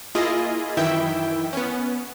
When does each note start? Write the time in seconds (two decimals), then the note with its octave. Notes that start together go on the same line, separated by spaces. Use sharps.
0.15 A#3 E4 F4 G#4 D#5
0.77 F#2 D#3 E3 E4 E5 G5
1.53 B3 C#4